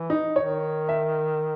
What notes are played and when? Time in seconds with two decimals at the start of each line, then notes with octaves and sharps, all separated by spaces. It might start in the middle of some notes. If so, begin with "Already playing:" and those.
Already playing: E3
0.10 D#4
0.36 D#3 C#5
0.89 E5